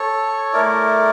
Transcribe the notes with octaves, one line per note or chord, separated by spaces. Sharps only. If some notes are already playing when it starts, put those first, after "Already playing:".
Already playing: A4 C#5
A3 E4 A#4 D5